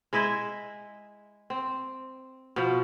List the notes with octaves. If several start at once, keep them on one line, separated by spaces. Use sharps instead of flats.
G#3 E4 D#5 E5
C4
B2 F3